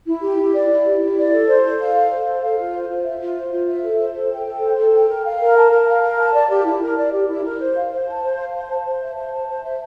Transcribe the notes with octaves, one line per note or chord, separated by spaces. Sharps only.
E4
G4
E4
D5
E4
G4
E4
D5
A4
C5
A4
F5
A4
C5
A4
F5
F4
C5
F4
E5
F4
C5
F4
E5
A4
C5
A4
G5
A4
C5
A4
G5
A#4
F5
A#4
A5
A#4
F5
A#4
A5
D5
G4
E4
A#4
D5
G4
E4
A#4
C5
F5
C5
A5
C5
F5
C5
A5
C5
E5
C5
A5
C5
E5